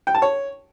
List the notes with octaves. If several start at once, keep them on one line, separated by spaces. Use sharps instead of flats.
G5
A5
C#5